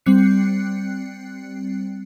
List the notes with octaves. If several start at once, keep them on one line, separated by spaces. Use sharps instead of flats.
G3 C4 F#6 C7 C#7